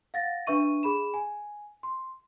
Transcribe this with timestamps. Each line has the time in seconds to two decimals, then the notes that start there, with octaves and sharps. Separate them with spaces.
0.14 F5 F#5 A6 A#6
0.47 D4 B4 E5 C#6 D#7
0.83 G#4 B5 E7
1.14 G#5
1.83 C6